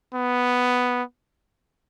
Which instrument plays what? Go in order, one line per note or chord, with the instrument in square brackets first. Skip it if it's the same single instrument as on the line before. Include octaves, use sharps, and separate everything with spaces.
[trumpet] B3